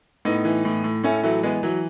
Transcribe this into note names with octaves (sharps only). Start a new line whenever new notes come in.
A2 B3 D#4
E3
A2
A2
A2 A3 C#4
E3 F#3 A3
E3 G#3 B3
E3 F#3